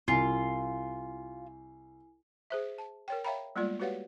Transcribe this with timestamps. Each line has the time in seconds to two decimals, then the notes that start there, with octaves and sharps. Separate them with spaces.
0.08 C2 E4 F4 G#5 C7
2.50 G#4 C5 E5
2.78 A5
3.08 A#4 C#5 G5
3.25 C#5 E5 F5 G5 A#5 B5
3.56 G3 G#3 A#3 B3 F4 D5
3.80 F#4 G4 B4 C#5 F5 F#5